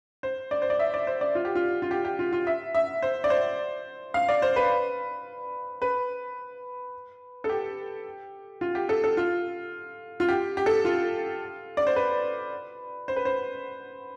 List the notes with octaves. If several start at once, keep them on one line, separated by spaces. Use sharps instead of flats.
C5
D5
C5
D5
E5
D5
C5
D5
F4
G4
F4
F4
G4
G4
F4
F4
E5
E5
C5
D5
C5
F5
D5
C5
B4
B4
A4
G4
F4
G4
A4
A4
F4
F4
G4
G4
A4
F4
D5
C5
B4
C5
B4
C5